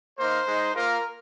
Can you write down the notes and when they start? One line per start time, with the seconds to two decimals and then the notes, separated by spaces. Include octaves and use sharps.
0.18 A#3 D#4 C5
0.46 G#3 D#4
0.73 A#3 F4 A#4